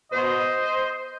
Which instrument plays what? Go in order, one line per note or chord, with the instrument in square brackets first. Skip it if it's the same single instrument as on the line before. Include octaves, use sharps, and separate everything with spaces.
[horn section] B2 C5 D#5